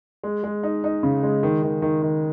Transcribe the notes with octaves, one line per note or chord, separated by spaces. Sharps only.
G#3
G#3
D#4
D#4
C#3
G#3
D#3
D#3
D#3
D#3